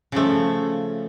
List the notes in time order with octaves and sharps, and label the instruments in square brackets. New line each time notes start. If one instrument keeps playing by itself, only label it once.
[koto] C#3 F3 A3